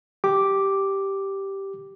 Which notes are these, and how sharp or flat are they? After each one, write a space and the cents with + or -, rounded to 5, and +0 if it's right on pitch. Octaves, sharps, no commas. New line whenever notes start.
G4 -5 D6 +0